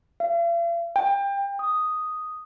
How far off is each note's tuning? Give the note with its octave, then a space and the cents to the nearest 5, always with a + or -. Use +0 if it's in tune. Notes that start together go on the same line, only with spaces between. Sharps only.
F5 -45
G5 +25
D#6 +0